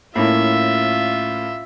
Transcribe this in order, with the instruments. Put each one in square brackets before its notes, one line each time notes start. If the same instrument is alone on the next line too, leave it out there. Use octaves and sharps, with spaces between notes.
[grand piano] A2 A#3 C#4 [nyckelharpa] F4 E5